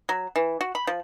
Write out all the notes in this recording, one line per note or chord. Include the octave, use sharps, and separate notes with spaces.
F#3
E3
F#4
B5
F3